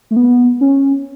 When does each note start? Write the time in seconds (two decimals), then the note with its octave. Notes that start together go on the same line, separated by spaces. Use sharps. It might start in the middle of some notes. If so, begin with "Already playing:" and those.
0.11 A3
0.16 B3
0.61 C#4